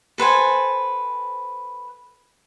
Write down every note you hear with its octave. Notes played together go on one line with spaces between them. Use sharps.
A4 B4 C5 G#5